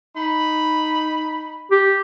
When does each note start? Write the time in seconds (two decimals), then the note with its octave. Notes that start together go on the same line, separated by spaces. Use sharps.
0.16 D#4 B5
1.71 G4